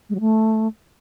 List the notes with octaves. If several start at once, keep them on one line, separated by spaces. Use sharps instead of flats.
G#3
F#3
A3